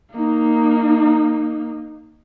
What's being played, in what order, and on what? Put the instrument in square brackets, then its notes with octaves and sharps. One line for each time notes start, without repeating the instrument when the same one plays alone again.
[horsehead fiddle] A#3 D#4